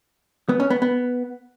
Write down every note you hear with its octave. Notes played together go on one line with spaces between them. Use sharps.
B3
C#4
B3
B3